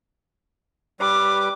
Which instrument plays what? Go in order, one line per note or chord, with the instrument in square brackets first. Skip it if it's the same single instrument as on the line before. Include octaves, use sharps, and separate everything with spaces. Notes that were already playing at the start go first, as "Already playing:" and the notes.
[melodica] G3 B4 [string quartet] D6